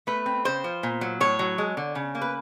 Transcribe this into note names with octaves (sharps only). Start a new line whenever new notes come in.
A3 B4
C4
C#3 C5
F3
A#2
F#3
A2 C#5
F#3
G#3
D3
C#3
A#3
B4